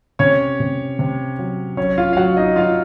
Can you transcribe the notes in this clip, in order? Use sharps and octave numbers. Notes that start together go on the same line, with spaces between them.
C3 C#4 C#5
C3
C3
F#3
F#3 C#4 C#5
F4 F5
F5
F#3 F#4 F#5
D#4 D#5
F#3 F4 F5